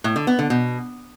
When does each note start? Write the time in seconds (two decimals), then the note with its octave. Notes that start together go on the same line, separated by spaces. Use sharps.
0.04 A2
0.16 D3
0.27 B3
0.39 D3
0.50 B2